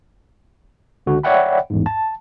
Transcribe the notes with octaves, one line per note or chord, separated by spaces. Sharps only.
C#2 D3 F#4
C#5 D5 E5 F#5 G5 B5
A1 E2 G#2
A5